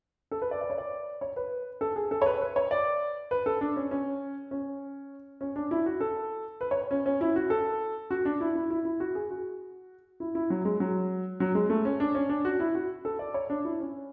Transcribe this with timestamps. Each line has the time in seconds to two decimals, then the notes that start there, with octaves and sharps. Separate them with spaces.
0.31 A4
0.42 B4
0.51 D5
0.61 D5
0.70 C#5
0.78 D5
1.21 C#5
1.36 B4
1.81 A4
1.96 G#4
2.11 A4
2.22 C#5
2.26 B4
2.41 B4
2.56 C#5
2.71 D5
3.31 B4
3.46 A4
3.61 D4
3.76 C#4
3.91 C#4
4.51 C#4
5.41 C#4
5.56 D4
5.71 E4
5.86 F#4
6.01 A4
6.61 B4
6.71 C#5
6.91 C#4
7.06 C#4
7.21 E4
7.36 F#4
7.50 A4
8.11 F#4
8.25 D4
8.41 E4
8.55 E4
8.70 E4
8.85 E4
9.00 F#4
9.15 G#4
9.31 F#4
10.20 E4
10.35 E4
10.50 F#3
10.65 G#3
10.80 F#3
11.40 F#3
11.55 G#3
11.70 A3
11.85 C#4
12.00 D4
12.15 C#4
12.29 D4
12.45 F#4
12.60 E4
12.75 F#4
13.05 A4
13.19 D5
13.34 C#5
13.50 D4
13.65 E4
13.80 C#4